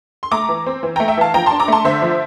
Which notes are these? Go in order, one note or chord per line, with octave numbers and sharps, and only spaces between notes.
C6
A3 A#5 D6
E3
C4
E3
A3 G5 A#5
E5 G5
E3 F5 A5
F3 G5 A#5
A5 C6
D4
A#5 D6
A3 A5 C6
D3 C5 E5
F3